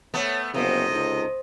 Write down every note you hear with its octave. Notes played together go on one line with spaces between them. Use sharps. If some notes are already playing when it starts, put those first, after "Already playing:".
A3 B3 A4 C#5
F#1 C3 F3 B3 C5 D#5
C#2 D#4 A4